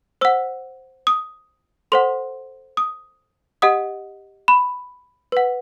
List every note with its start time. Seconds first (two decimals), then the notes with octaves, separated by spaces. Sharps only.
0.21 C5 F#5 E6
1.07 D#6
1.92 A4 C5 F#5 C6
2.77 D#6
3.62 G4 D#5 F#5 D#6
4.48 B5
5.32 B4 F#5